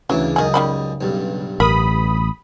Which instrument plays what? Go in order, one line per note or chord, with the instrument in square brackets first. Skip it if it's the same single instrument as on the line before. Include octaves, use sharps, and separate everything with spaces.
[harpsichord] D2 E3 D4 [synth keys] C#3 [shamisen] F#3
[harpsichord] C#2 F#2 D#5 [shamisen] D#3 G#4
[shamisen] D#3 G3 B5
[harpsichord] B1 G2
[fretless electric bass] A1 [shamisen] A#4 [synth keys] B5 D#6